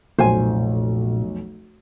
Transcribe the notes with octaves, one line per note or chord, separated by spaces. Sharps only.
F1 B1 A#2 C5 G#5